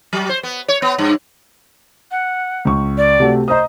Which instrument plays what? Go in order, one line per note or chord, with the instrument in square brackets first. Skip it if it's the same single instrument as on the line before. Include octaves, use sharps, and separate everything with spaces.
[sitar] F#3
C5
B3
C#5
B3
G2
[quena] F#5
[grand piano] C#2 C#6
[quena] D5
[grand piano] C3 A3 F#4
[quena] C5 [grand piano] D#5 A#5 D#6